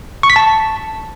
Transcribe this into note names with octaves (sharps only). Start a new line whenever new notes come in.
C#6
B6
A5